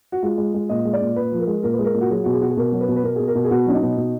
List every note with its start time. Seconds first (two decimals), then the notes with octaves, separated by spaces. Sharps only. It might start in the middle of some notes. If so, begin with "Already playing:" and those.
0.12 F#4
0.23 G#3 F4
0.38 G#3
0.54 G#3
0.69 A#2 D#5
0.85 G#3
0.93 D5
1.01 A#2
1.16 A#2 B4
1.32 F3
1.39 A#4
1.47 G#3
1.63 A#2 A#4
1.74 B4
1.79 G#3
1.84 A#4
1.94 A#2
2.01 F#4
2.10 F#3 G#4
2.24 B2 F#4
2.33 G#4
2.41 B2 F#4
2.49 G#4
2.57 B2 A#4
2.72 F#3
2.81 B4
2.88 B2
2.96 B4
3.04 B2 A#4
3.16 B2 G#4
3.27 A#4
3.35 B2
3.44 G#4
3.50 B2 F#4
3.66 F#3 D4
3.74 D#4
3.82 B2
3.97 B2